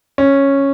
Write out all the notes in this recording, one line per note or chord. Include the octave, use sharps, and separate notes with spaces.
C#4